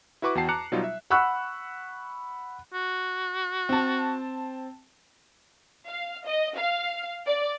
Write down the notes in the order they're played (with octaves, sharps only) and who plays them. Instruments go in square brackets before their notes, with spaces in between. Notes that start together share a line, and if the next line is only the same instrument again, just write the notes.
[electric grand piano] E4 F#4 B4 C#6 D6
E2 F#4 G5 A5 C7
A5 A#5 D6 F#6 C#7
B2 F#3 G3 D#4 F4
E5
[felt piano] F#5 B5 C#6 E6 F#6
[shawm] F#4
[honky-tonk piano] C4 A5
[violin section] F5
D#5
F5
D5